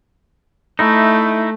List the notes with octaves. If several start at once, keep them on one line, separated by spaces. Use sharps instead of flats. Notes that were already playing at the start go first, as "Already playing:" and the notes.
A3 D#4 E4